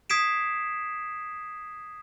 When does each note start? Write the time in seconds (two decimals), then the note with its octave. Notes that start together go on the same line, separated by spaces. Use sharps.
0.10 D#6 G#6 B6 C7 D7 E7